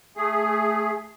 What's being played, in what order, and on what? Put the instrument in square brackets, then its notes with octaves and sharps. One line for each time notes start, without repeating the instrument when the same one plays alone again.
[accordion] A3 G#4